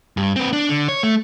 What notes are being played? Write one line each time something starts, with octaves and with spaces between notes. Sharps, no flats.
G2
C4 B4
D4
D3
C#5
A3